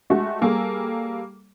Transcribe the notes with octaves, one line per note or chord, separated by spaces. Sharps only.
G#3 A3 F#4 G4
G3 A#3 G#4 A4